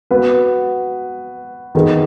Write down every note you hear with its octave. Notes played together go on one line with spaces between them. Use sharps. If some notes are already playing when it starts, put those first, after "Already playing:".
B3 F#4 B4
D#3 B3 D#4 G#4